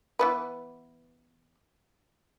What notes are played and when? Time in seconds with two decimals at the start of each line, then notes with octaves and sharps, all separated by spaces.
0.19 E3 B3 B4